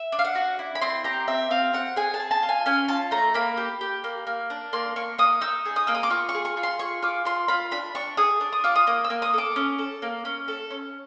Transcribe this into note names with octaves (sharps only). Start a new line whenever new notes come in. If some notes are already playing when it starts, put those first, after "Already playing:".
Already playing: E5
D4
F5
F#5
F#4
E4
B5
C4 C6
G4 A#5
C4 E5
C4 F5
C4 F#5
G#4 G#5
A5
G#4
A5
F4
G#5
C#4 G#5
F4 A5
A3 A#5
A#3 B5
G4
G4
A#3
A#3
D4
A#3 C6
A#3 C#6
A#3 D#6
D#4 E6
G#4
D#6
A#3 E6
D#6
D6
F4 C#6
C#6
G#4
C#6
F4
C6
G#4 C#6
F4 D6
F4 C6
F4 B5
D4 B5
D4 C#6
G#4 D#6
D4
D#6
F4 D6
D#6
A#3 D#6
E6
A#3
D#6
A4 D6
C#4
A4
A#3
C#4
A4
C#4